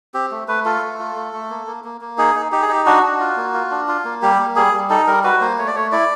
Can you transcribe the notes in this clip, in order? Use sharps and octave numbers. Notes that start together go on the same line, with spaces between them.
C4 G4
A3
A3 B4
F4 A4
A3
F4
A3
A3
A#3
A#3
A#3
A#3
D#4 G#4
D#4
D#4 G4
G#4
D#4 G4
D4 F#4
D4
F4
A#3
F4
D4
F4
A#3
G3 G4
A#3
G3 G#4
G3
D#4 A4
G3 A#4
F#4 B4
A#3 C5
A3 C#5
D5
A3 C#5
E4 D5